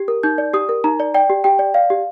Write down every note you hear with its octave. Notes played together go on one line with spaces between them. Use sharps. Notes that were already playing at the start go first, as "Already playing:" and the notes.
Already playing: G4
A#4
D#4 G6
D5
G4 D#6
A#4
D#4 A#5
D5
D5 G5
G4
G4 G5
D5
D5 F5
G4